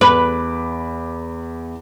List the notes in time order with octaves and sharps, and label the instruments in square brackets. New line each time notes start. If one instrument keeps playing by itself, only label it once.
[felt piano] E2 B5 D6 [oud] B4